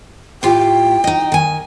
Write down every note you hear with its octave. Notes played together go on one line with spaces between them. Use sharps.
A2 F4 G4 G5
D#4 D#5
D#3 G#5